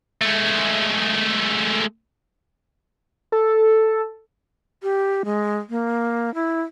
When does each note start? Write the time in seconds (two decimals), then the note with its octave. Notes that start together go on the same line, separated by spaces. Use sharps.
0.22 G#3 A3
3.32 A4
4.83 G4
5.25 G#3
5.69 A#3
6.34 E4